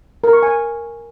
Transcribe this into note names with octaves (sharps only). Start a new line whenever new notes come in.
A#4
C#6
G#5